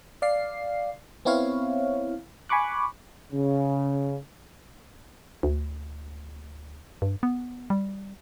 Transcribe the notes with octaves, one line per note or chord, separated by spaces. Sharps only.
D5 F5 C7
B3 C4 E4 C#5 F5
G#5 B5 C#6 D6 F#6
C#3
D2
G2
B3
G3